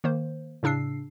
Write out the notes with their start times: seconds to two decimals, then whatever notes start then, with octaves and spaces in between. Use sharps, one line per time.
0.04 D#3 A#3 C5
0.63 A2 C#3 D4 E6 C7